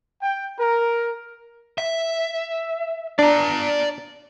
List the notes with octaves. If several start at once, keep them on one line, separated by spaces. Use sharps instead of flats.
G5
A#4
E5
D4 D5 A#5